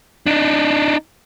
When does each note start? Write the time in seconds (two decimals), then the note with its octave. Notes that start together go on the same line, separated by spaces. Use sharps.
0.26 D4 D#4